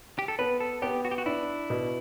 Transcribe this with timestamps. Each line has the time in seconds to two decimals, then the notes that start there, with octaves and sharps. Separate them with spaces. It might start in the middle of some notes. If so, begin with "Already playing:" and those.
0.19 G4
0.28 A4
0.39 B3 B4
0.60 A4
0.82 B3 G4
1.05 F#4
1.11 G4
1.18 F#4
1.26 D4 E4
1.70 B2